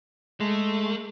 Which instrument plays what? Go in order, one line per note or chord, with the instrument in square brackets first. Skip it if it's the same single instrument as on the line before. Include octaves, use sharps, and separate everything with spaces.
[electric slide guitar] G#3 [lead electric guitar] A3